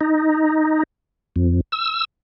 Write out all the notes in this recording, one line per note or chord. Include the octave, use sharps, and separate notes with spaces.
D#4
F2
E6